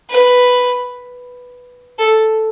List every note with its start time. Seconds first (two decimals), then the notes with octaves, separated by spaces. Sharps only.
0.10 B4
1.98 A4